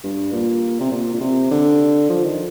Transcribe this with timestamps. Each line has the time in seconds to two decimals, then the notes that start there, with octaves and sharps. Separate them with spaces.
0.04 G2
0.33 A#2
0.80 C3
0.92 A#2
1.14 A#2
1.20 C3
1.51 D3
2.10 F3
2.24 D#3